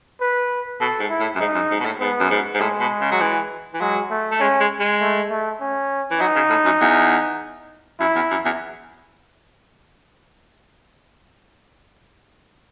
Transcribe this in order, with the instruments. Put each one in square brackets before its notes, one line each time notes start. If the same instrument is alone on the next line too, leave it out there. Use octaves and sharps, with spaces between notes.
[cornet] B4
[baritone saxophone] B2 [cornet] A4
[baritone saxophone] G#2
[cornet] E4
[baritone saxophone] A2
F#2
[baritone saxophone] G#2 [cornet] D#4
[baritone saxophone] F#2
G#2
B2
A2
[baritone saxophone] G#2 [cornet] B3
[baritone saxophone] F#2
G#2
G#2
[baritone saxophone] A2 [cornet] G#3
[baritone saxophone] B2
C#3
F#3
E3
E3
[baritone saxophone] F#3 [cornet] G#3
[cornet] A3
[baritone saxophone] A3
[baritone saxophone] G#3 [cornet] C#4
[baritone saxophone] G#3
G#3
[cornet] A3
A3
C#4
[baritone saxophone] E3
[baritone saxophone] F#3 [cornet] D#4
[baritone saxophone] C#3
A2
F#2
E2
[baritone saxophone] F#2 [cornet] E4
[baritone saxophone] E2
F#2
E2